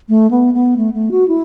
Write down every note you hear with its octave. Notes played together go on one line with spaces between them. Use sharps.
A3
B3
B3
A3
A3
F#4
E4